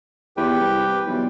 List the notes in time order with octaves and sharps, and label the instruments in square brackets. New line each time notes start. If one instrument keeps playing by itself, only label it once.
[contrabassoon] E2 [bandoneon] G4 B4 G5
[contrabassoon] C2
[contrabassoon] B1 [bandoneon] E3 G3